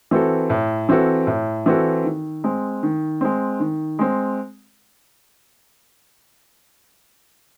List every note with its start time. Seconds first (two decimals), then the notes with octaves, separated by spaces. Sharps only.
0.11 E3 C4 F#4 A4
0.50 A2
0.89 E3 C4 F#4 A4
1.27 A2
1.66 E3 C4 F#4 A4
2.04 D#3
2.44 G#3 C4
2.83 D#3
3.21 G#3 C4
3.60 D#3
3.99 G#3 C4